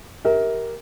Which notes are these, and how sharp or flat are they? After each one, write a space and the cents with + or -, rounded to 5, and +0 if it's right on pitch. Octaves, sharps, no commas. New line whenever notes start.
G4 -5 A#4 +0 E5 -35